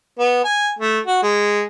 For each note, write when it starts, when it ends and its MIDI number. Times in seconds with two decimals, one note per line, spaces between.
0.19 0.44 59
0.44 0.69 80
0.79 0.99 57
1.06 1.18 66
1.22 1.62 56